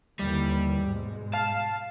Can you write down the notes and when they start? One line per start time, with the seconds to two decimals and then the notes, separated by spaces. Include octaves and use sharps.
0.19 D#2 D3 E3 G3
0.84 G#2 B2 G#3
1.33 F5 A5